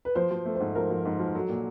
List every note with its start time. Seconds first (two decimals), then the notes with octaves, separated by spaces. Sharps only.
0.05 B4
0.15 F3 C5
0.31 F3
0.45 A3
0.55 C5
0.60 G#2
0.75 F3 A#4
0.90 F3
1.05 G#2
1.19 F3
1.35 F#3 A4
1.49 A#2